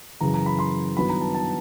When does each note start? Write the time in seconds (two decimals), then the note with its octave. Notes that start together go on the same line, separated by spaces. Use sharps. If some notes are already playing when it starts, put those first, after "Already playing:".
0.21 F#2 C#3 E3 A#5
0.34 A#5
0.46 B5
0.59 C6
0.96 G2 D#3 F#3 B3 E4 B5
1.09 A#5
1.21 A5
1.34 A5